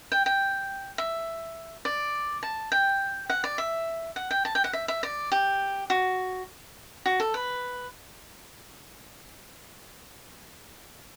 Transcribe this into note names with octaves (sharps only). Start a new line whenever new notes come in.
G5
G5
E5
D5
A5
G5
F#5
D5
E5
F#5
G5
A5
G5
F#5
E5
E5
D5
G4
F#4
F#4
A4
B4